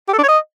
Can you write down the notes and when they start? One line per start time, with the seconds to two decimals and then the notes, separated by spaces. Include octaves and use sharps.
0.08 G4
0.13 A4
0.18 D4
0.23 C#5
0.28 D#5